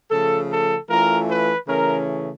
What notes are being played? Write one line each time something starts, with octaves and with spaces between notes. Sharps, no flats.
C#3 F3 A3 A4
A4
E3 A3 C#4 F4 A#4
B4
C#3 E3 A3 C#4 A#4